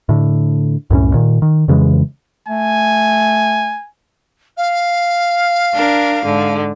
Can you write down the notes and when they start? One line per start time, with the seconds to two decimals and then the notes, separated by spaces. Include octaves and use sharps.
0.09 A2 D3
0.90 C2 F#2 A2 C#4
1.14 A#2 D#3
1.42 D#3
1.68 F2 C#3 E3 G#3
2.48 A3 G#5
4.57 F5
5.73 D4 A#4
6.24 G#2 D3